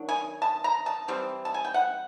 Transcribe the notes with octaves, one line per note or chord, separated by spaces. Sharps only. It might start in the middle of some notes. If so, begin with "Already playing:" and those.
Already playing: D#3 F#3 D4
G#5
A5
A#5
A5
E3 G3 C4
A5
G#5
G5
F#5